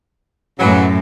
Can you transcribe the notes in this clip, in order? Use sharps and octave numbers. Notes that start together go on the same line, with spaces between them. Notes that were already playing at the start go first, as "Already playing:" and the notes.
F#2 A2 C#3 E3 F#3